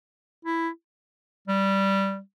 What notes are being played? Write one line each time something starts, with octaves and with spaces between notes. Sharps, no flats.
E4
G3